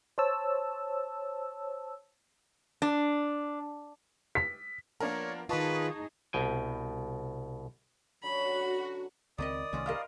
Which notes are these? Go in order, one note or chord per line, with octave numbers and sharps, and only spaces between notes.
C5 C#5 A5 E6
D4
B6
F3 A#3 B3 D4 A#4 C#5
D#3 D#4 F4 G#4 B4 D#5 A5 C#6
C2 B2 G5 G#5
D3 F#3 C#4 F#4 B5
C#2 D#3 C4 E4 D5 D#5 D#6
C2 D#3 A3 C#4 F4 F#4
E4 A#4 C5 D#5 F5 F6